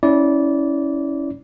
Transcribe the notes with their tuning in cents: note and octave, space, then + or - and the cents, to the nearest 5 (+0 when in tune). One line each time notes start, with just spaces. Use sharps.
C#4 +0 E4 -25 D5 -20